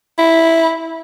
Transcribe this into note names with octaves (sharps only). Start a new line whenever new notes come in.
E4